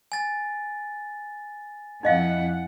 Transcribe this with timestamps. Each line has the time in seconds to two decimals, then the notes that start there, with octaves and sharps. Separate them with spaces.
0.12 G#5 A6
2.03 F2 D#4 E4 D#5 F5 F#5